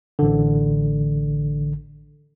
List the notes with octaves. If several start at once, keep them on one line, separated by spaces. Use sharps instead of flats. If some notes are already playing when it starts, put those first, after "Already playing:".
A1 D3